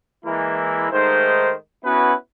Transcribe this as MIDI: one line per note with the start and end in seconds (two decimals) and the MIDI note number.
0.24 0.90 52
0.24 0.90 56
0.24 0.90 58
0.24 0.90 64
0.91 1.52 44
0.91 1.52 51
0.91 1.52 57
0.91 1.52 72
1.84 2.13 59
1.84 2.13 61
1.84 2.13 64
1.84 2.13 66
1.84 2.13 71